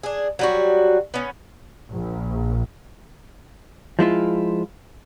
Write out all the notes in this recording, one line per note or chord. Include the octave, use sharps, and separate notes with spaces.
D4 G#4
F#3 G3 F#4
B3 C#4
A#1
F3 G#3 E4 F4